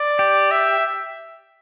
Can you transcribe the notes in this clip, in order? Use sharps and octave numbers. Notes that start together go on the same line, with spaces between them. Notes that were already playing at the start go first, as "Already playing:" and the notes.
Already playing: D5
G4
E5